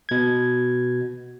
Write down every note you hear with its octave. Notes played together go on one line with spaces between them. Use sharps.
B2 G#6